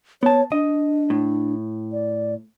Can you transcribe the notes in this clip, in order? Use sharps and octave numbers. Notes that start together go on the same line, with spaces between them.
B3 C#5 A5
D4 D#5
A2
D5